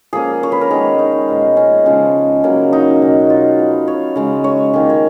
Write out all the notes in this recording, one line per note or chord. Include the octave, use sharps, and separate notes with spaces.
F3 A#3 C#4 G#4
C#5
B4
A#4
D#3 G#3 B3 G#4
D#4
A#2 F3 G#3 B3
C#4
C#3 F3 G#3 C#4
C#3 F#3 A#3 C#4
D#4
B2 F#3 C#4
F4
F3 B3
C#5
C#3 G#3 C#4
C#5
D#3 A#3 C#4
C#5